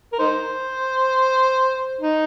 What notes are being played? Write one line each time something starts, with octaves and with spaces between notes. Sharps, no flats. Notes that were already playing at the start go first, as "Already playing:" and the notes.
A#4
D#4 C5
D#4